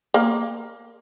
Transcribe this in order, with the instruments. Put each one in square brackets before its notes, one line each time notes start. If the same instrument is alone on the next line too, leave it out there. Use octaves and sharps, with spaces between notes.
[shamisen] A#3